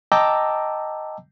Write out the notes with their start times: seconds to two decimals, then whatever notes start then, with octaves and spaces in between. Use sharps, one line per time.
0.12 D#5 G5 A5 A#5 D6 E6